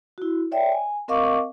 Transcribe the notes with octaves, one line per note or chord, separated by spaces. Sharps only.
E4 F#4
C#5 D5 E5 G5
G#5
C4 A#4 D#5 F5 C#6 D6